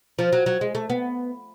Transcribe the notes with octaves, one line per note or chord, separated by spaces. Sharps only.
F3
F#3
F#3
G#3
A3
B3